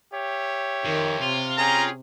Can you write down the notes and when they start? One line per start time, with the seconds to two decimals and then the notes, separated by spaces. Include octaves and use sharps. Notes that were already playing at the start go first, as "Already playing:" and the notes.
0.13 G4 C#5 E5
0.85 F2 D#3
1.22 C3 F4
1.57 C#4 G#4 G5 A#5